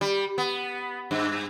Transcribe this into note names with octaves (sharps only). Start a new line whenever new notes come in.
G3
B3
G2